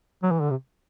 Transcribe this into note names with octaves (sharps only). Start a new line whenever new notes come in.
F#3
E3
D3
C3